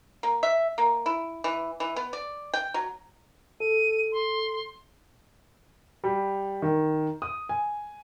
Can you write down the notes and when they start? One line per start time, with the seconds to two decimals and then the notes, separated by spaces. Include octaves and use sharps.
0.23 A#3
0.43 E5
0.78 A#3
1.06 E4
1.44 E3
1.80 E3
1.96 B3
2.13 D5
2.54 G5
2.74 F#3
3.60 A4 D#7
4.12 C6
6.04 G3
6.62 D#3
7.22 D#6
7.49 G#5